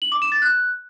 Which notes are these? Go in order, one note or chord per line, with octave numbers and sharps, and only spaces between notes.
F#7
D6
E7
A6
F#6